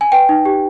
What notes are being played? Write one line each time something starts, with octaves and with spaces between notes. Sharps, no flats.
G#5
B4 G5
D#4
G4